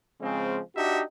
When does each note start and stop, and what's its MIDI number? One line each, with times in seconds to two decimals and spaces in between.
0.22 0.60 49
0.22 0.60 53
0.22 0.60 56
0.22 0.60 60
0.76 1.03 62
0.76 1.03 63
0.76 1.03 66
0.76 1.03 67
0.76 1.03 76